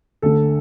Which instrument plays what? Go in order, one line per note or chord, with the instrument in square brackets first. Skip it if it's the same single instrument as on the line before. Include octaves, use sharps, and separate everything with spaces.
[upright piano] D2 D3 A4